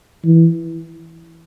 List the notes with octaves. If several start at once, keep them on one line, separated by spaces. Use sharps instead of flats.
E3